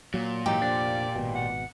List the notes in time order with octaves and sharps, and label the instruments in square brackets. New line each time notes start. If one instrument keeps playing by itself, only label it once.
[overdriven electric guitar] A#2 [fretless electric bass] F#3
[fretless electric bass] G#2 E3 F#3 [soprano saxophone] D#4 [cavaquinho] G4
[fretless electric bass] F1 F3 D4 [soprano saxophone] D5
[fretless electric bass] G#1 B2
[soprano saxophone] F#5